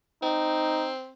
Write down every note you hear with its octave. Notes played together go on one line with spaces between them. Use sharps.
C4 D#4